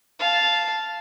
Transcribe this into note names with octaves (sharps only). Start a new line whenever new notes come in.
F5 A5